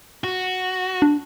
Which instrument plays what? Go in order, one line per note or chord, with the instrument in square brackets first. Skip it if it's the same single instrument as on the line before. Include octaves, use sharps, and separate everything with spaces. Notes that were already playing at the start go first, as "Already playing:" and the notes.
[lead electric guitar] F#4
[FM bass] D4